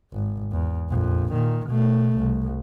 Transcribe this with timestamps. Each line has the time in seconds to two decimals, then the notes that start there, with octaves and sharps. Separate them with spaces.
0.13 G#1
0.52 E2
0.89 A#1 F2
1.32 A#2 D#3
1.67 B2 A3
2.17 C2